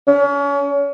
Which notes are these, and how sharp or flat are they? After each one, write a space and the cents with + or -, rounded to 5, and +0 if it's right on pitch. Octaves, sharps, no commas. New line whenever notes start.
C#4 +35